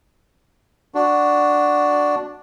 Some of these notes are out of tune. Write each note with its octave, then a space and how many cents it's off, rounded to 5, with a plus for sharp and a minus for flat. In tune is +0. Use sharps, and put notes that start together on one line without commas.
D4 +0 F#4 +0